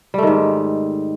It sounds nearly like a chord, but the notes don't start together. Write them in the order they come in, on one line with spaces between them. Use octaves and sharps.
G3 A3 D#3 G#2